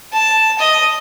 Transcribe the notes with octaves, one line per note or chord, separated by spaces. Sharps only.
A5
D#5